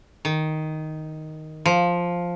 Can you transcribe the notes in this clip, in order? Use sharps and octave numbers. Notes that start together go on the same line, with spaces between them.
D#3
F3